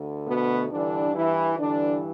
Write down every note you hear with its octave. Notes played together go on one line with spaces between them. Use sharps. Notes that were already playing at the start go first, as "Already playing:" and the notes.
Already playing: D2 D3
B2 B3
G2 D3 E3 D4
E3 E4
G2 D3 E3 D4